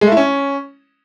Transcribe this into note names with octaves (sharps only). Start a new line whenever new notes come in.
G#3
A3
E4
C#4